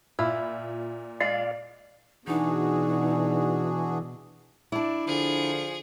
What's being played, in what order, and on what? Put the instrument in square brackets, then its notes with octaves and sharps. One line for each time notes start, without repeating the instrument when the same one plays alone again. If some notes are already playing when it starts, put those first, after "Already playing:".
[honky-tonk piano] A#2 [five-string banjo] E4 [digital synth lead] F4
[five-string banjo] G#3 [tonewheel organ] D5 F5
[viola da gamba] B2 [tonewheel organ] E3 [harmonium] D4 F#4 G#4 [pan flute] D#4
[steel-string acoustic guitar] D4 E4 [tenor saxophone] D5
[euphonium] D3 [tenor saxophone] F3 [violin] G#4